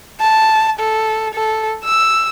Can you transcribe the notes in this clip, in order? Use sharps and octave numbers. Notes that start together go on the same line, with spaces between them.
A5
A4
A4
E6